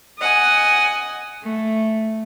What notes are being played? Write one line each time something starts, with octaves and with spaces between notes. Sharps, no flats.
D#5 F#5 G#5
A3